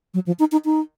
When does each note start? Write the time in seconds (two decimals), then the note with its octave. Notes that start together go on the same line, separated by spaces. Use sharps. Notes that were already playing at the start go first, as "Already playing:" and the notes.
0.14 F#3
0.26 F3
0.39 D#4
0.52 D#4
0.65 D#4